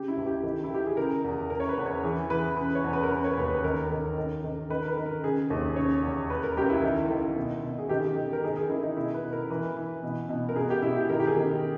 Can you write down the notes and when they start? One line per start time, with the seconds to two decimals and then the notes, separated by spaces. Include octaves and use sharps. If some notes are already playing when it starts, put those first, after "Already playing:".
Already playing: C#3 G4
0.08 E4
0.17 C#2
0.26 G4
0.43 D#3
0.64 E4
0.70 D#3 G4
0.86 G#4
0.97 C#3 A#4
1.24 E2
1.50 C#3 A#4
1.60 C#5
1.69 B4
1.78 E2
1.86 C#5
2.04 E3 G#4
2.30 E3 B4
2.57 C#3 B4
2.75 C#5
2.84 E2
2.93 B4
3.03 A#4
3.11 C#3 B4
3.24 C#5
3.38 D#2 B4
3.50 B4
3.64 D#3 A#4
3.91 D#3
4.18 D#3
4.44 D#3
4.70 D#3 B4
4.82 A#4
4.88 B4
4.97 D#3
5.06 A#4
5.23 C#3 G#4
5.50 D#2
5.76 C#3 C#5
6.03 E2
6.30 C#3 B4
6.43 A#4
6.57 C#2 G4
6.69 E4
6.83 D#3 E4
7.10 D#3
7.36 B2
7.64 B2
7.78 G#4
7.89 D#3 G4
8.16 D#3
8.33 A#4
8.44 D#3 G#4
8.50 A#4
8.57 G#4
8.69 D#3 E4
8.83 D#4
8.97 B2 E4
9.14 B4
9.23 B2
9.33 A#4
9.50 E3 B4
9.77 E3
10.03 B2
10.29 B2
10.49 A#4
10.56 B2 G#4
10.70 G4
10.82 B2 E4
10.96 G4
11.09 D#3 A#4
11.20 G4
11.27 G#4
11.36 D#3